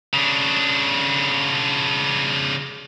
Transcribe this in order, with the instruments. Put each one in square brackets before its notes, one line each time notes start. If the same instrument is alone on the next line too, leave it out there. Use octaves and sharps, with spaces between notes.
[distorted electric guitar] C#3 D4